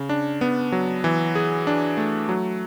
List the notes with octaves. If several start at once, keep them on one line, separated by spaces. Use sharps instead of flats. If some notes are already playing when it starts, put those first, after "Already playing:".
Already playing: C#3
D4
B3
F#3
E3
G#4
D4
A3
F#3